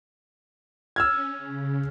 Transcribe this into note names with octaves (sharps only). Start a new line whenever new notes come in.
C#4 E6 F6 G#6
C#3